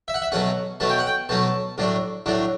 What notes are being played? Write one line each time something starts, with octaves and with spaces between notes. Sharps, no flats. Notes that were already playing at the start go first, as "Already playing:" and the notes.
E5
F#5
E5
B2 F#3 A3 C#4 F#5
B2 F#3 A3 C#4 A5
G5
F#5
G5
B2 F#3 A3 C#4 A5
A2 F#3 A3 D4
A2 F#3 A3 D4